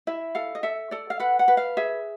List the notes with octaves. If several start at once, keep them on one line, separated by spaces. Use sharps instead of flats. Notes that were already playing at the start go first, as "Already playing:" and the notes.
E4 E5
A4 F5
D#5
A4 E5
A4 D5
F5
B4 F#5
F#5
B4
F5
G#4 E5